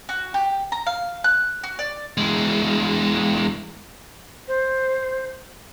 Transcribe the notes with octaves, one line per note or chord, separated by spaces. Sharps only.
F#4
G4
A#5
F5
F#6
F#4
D5
E2 G#3
C5